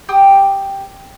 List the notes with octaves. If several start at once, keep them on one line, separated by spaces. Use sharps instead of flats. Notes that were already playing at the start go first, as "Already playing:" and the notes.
G4 G5 C6 D#6